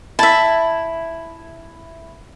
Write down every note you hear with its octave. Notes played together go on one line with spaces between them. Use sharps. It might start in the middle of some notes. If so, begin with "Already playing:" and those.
E4 E5 A5